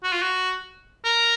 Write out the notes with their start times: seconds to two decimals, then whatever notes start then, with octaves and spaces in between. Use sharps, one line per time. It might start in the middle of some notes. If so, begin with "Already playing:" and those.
0.03 F#4
0.12 F4
0.22 F#4
1.05 A#4